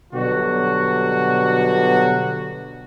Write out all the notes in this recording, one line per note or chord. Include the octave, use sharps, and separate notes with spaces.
B2 D3 F#3 G3 F#4